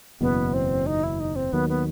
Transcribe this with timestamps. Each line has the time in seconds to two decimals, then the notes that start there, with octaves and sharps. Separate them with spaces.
0.21 F#1 E2 B2 B3
0.54 C4
0.86 D#4
1.04 E4
1.20 D#4
1.36 C4
1.53 D#2 D#3 F#3 B3
1.69 B3